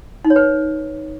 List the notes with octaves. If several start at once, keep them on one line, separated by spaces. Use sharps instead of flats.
D#4
C#5
B4